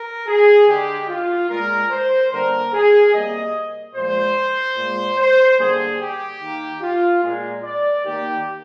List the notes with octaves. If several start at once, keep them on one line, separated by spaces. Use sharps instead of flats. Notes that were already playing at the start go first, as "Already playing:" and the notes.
Already playing: A#4
G#4
D3 G#3 G4
F4
A#2 G#3 A#4
C5
D3 G3 A#3 A#4
G#4
C3 G3 A#3 D#5
A#2 F3 G#3 C5
A#2 G#3
C5
D3 G3 A#3 G#4
G4
D#3 A#3
F4
A#2 G#3
D5
D#3 A#3 G4